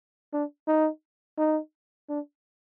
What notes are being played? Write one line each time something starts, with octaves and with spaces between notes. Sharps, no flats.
D4
D#4
D#4
D4